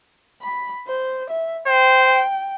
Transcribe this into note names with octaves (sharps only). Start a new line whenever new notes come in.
B5
C5
E5
C5 G5